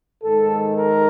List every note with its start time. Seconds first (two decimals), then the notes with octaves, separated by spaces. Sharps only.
0.23 G#2 D#3 G#3 A4
0.77 A#4